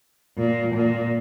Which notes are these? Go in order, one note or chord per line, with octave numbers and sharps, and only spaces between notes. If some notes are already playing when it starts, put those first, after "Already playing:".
A#2
A#2